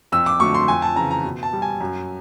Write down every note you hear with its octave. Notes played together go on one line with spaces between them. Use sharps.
F2 E6
D6
D3 F#3 A3 C#6
C6
F2 G#5
A5
C#3 E3 A#5
A#5
B2
A5
G3
G#5
F#2